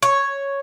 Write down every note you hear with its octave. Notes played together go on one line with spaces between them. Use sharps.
C#5